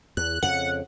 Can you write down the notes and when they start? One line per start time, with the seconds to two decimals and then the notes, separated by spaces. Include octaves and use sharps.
0.17 E2 F#6
0.43 F2 C#3 F#5